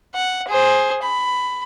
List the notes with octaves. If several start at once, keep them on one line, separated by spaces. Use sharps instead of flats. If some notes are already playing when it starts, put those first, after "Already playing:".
F#5
G#4 C5
B5